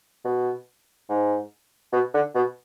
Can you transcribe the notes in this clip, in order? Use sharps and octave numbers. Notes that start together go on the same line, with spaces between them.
B2
G#2
B2
D3
B2